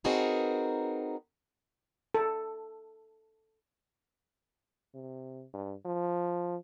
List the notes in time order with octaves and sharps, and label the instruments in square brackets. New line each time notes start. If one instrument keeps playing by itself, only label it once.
[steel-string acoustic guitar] C4 D#4 F#4 G#4 A#4 B4
[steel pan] A4
[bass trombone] C3
G2
F3